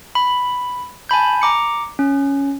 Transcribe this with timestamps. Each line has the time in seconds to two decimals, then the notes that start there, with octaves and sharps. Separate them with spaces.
0.15 B5
1.09 G#5 A5 B5 G6
1.42 A#5 D6 C#7
1.99 C#4